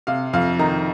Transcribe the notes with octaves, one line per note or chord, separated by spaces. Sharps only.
C3 F5
F2 F5
D#3 A#5